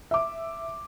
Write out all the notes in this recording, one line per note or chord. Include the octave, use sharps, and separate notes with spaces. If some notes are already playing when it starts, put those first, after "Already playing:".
E5 D6